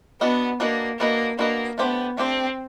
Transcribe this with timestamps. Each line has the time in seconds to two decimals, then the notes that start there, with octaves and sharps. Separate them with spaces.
0.21 B3 D4 F#4 B4 D#5
0.60 A#3 D4 F#4 B4 D#5
0.99 A#3 D4 F#4 B4 D#5
1.39 A#3 D4 F#4 B4 D#5
1.78 A3 B3 D4 G4 C5
2.17 A3 C4 D4 G4 C5